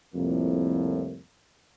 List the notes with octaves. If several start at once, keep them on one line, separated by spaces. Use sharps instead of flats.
C2 F2 A2 A#3